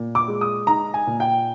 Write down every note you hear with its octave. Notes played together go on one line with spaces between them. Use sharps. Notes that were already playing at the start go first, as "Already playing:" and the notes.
Already playing: A#2
D6
G#3
D#6
D#4 A#5
G#5
A#2
G5